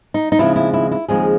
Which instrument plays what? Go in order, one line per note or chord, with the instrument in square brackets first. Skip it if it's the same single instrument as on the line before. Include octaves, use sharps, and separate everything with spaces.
[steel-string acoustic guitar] D#4
D#4
D#2 C#3 F3 G#3 C4 E4
E4
E4
E4
D#2 C#3 F3 G#3 C4 G#4